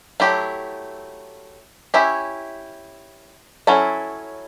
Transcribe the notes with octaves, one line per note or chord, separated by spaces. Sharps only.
F#3 A3 E4 G4
C#4 E4 G4 C#5 E5
F#3 C#4 E4 A4